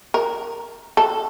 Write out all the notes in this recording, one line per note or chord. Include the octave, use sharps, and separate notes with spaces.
A#4
A4